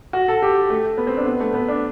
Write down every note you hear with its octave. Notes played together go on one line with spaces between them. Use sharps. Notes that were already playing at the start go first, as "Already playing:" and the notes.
F#4
A4
G4
A3
B3
C4
D4
B3
A3
B3
D4